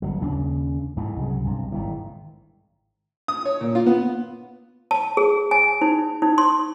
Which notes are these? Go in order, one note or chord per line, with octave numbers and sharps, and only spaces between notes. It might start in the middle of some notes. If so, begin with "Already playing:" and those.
G1 F#3
D#2 C#3 D4
D2 G#2 E3
C2 C#3 F#3
B1 G2 C3
G#1 D#3 E3
D#6
C#5
A#2
F4
B3
A5
G#4
G#5
D#4
D#4
C6